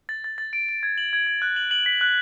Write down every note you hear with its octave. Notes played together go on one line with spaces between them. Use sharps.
A6
A6
A6
D7
D7
G#6
F#7
G#6
G#6
F#6
F#7
F#7
B6
F#6